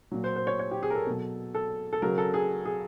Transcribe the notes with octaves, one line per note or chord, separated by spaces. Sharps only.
A#2 F#3
C5
C5
C#5
C#5
G4
G#4
A#4
A4
B2 F#3
A4
A4
C#3 F#3 A#4
A4
G#4
G#4